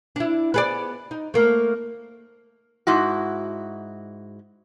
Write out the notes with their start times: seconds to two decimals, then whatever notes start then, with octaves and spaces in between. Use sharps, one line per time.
0.16 D4 E4
0.54 B3 G#4 D5
1.11 D#4
1.34 A3 A#3
2.87 G#2 E4 F#4